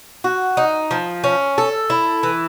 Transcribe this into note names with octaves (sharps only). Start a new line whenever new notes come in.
F#4
D#4
F3
C#4
A4
E4
E3